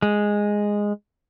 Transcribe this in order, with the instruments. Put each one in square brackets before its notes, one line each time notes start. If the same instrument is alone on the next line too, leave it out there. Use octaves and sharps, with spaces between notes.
[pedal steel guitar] G#3